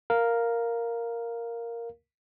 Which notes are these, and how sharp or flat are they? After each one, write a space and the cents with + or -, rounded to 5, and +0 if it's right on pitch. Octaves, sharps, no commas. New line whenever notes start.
A#4 +0 F5 +0